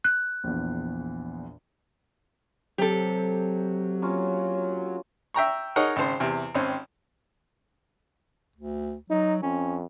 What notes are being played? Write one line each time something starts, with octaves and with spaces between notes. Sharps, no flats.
F#6
A#1 E2
C3 F#3 G4 A4
A#3 C#4 F4
E5 G5 A#5 C#6
D#4 G#4 A#4 C#5 D#5 F#5
G#1 C#3 C5
E2 C3
G#1 C4 C#4
D2
F#3 D#4
F2 C#4